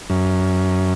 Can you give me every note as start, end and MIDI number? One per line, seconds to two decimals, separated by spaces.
0.10 0.94 42